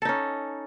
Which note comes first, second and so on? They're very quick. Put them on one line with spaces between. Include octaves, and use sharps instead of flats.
A4 D#4 C#4